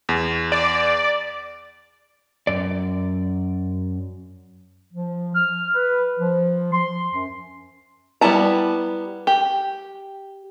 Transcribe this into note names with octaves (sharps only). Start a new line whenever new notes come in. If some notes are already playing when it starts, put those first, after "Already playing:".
E2
D5
F#2 D5
F3
F6
B4
F3
C6
F#2
G3 B3 E4 A5 A#5
G4